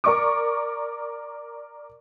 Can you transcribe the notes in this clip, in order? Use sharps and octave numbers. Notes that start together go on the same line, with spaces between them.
A#4 D5 C#6 D6